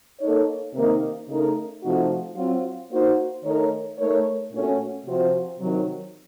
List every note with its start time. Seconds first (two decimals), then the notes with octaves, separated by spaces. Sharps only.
0.20 A#3 D#4 A4 C#5
0.74 C3 D#3 A#3 D#4 A#4
1.28 C#3 A3 D#4 A#4
1.82 C3 F3 A3 D#4 F#4
2.36 F#3 C4 F4
2.90 A#3 D#4 F#4 C5
3.44 D#3 A3 D#4 A#4 C#5
3.98 A3 D#4 A#4 C#5
4.52 A#2 A3 C#4 F#4
5.06 C3 F3 C4 F#4 C5
5.60 C3 D#3 F#3